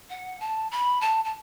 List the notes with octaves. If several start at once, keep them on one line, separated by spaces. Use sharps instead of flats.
F#5
A5
B5
A5
A5